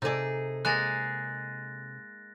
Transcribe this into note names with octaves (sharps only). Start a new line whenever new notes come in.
C3 D#4 G#4 A4 D5
G#3 A#3 G#4 F#6 A6 A#6